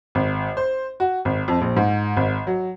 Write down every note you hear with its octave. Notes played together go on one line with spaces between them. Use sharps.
G#1
C5
F#4
G#1
F2
A#1
G#2
G#1
F#3